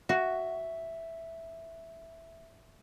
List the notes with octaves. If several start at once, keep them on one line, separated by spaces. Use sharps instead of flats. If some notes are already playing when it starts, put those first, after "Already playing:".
F#4 E5